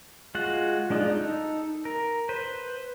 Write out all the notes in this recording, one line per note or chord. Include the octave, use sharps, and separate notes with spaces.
G#3 F4 F#4 F#5
G#3 D4 D#4 F4
D#4 A4
A#4
B4 C5